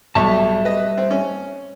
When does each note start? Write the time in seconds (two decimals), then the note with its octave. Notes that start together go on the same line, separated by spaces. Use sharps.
0.15 B1 G3 E5 A5 C#6
0.65 B4 D#5
0.98 C4
1.11 C#4